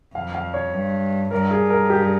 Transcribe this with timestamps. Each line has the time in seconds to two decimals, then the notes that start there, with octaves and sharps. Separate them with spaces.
0.15 F2 F5
0.35 F5
0.54 C#5
0.73 G2
1.31 G2 A#4
1.51 G#4
1.70 A#4
1.90 G4
2.02 G4